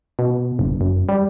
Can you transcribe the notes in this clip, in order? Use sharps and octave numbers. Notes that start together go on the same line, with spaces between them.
B2
F#1
F#2
G3